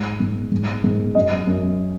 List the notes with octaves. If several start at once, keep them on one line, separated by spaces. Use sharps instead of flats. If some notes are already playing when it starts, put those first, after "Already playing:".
Already playing: G#2
G#2
G#2
G#2
F#2 D#5
F#2